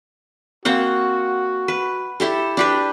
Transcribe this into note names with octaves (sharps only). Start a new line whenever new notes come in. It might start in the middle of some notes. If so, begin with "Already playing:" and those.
A#3 C4 F#4 F#5
B4
E4 G4 A4
D4 G4 B4